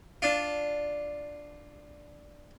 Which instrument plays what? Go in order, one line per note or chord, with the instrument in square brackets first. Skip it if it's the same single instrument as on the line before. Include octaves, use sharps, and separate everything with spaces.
[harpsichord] D4 F4